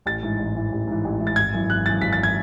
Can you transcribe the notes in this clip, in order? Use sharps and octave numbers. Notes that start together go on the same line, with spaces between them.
A1 A6
G#2 E3
A1
G#2 E3
A1
G#2 E3
A1
G#2 E3
A6
G#1 G#6
F#2 E3
G#1 F#6
F#2 E3 A6
G#1 B6
A6
E3 G#6